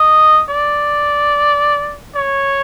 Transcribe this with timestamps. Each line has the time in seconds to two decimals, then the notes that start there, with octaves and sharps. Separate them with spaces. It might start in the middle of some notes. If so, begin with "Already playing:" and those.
Already playing: D#5
0.49 D5
2.15 C#5